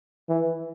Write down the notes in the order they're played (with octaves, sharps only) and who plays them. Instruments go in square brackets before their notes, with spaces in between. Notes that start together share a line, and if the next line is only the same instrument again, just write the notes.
[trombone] E3